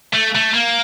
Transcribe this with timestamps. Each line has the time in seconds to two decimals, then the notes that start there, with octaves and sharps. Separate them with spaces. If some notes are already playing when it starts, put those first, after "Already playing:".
0.13 A3
0.35 A3
0.54 A#3